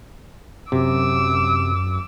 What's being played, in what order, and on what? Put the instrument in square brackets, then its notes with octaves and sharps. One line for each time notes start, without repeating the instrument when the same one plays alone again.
[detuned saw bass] F#2 [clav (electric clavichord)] C3 [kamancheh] D6 E6